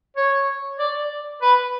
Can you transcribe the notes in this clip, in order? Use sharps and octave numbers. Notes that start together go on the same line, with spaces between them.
C#5
D5
B4